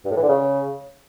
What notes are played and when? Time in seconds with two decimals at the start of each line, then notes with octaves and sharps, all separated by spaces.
0.05 G2
0.11 A2
0.17 E3
0.22 D3
0.28 C#3